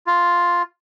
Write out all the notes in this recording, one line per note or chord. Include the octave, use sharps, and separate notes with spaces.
F4